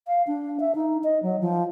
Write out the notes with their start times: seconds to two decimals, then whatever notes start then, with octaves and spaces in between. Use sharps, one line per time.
0.07 F5
0.27 D4
0.60 E5
0.75 D#4
1.04 D#5
1.22 F#3
1.41 F3